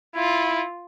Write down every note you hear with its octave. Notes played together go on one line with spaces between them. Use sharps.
E4 F4